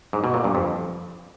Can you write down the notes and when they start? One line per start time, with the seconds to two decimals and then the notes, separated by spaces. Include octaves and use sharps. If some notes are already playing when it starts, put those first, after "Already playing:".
0.13 G#2
0.24 B2
0.34 A#2
0.44 G2
0.55 F2